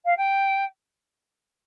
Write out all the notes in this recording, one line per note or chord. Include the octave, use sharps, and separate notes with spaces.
F5
G5